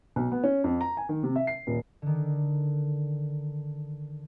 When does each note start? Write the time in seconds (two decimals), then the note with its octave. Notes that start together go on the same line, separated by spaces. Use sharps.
0.16 B1
0.32 B3
0.44 C#4
0.64 F2
0.81 A#5
0.97 G#5
1.09 D#3
1.23 C3
1.36 E5
1.47 C7
1.67 D#1
2.02 D3 D#3